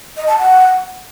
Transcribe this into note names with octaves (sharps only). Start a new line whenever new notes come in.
D#5
A5
F#5